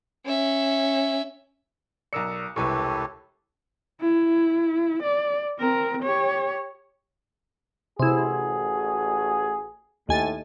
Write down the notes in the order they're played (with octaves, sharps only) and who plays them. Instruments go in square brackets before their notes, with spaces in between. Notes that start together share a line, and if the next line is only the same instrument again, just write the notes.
[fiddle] C#4 E5
[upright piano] B1 A#4 C#7 [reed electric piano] D5 E6
[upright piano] E1 E4 B4 [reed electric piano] C2 C#6 [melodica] G4 A4 C#5
[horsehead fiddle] E4
D5
C4 A#4
G4 C#5
[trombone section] A1 F#4 G#4 [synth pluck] C3 E4
[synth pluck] D#2 G#5 A6 [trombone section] A2